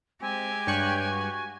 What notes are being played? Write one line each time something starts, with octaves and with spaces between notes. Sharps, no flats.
G#3 C4 G4 G#5
G2 C#5 G5 C#6 F#6
F#4